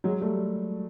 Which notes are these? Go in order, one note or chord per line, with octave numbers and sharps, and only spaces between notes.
F#3 G#3
G3 A3